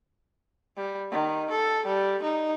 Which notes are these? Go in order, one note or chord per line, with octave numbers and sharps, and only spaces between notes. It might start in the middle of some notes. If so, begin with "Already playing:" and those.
G3
D#3
A4
G3
D#4